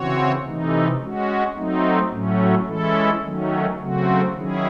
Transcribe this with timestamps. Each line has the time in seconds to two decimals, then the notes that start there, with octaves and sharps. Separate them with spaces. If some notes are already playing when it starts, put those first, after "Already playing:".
Already playing: C#3 E3 C4 F#4 C#5
0.43 C3 E3 A3 D#4
0.99 G#3 C#4 F#4
1.55 F#3 A3 C4 D#4
2.10 A2 F#3 A3 C#4
2.66 E3 G#3 C#4 E4 A4
3.22 D#3 F#3 A3 C#4
3.78 C#3 F#3 A3 C4 F#4
4.33 D#3 F#3 C#4 E4 G#4